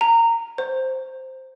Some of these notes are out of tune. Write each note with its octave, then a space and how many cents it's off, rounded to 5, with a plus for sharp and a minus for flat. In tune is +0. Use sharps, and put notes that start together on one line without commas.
A#5 -20
C5 +0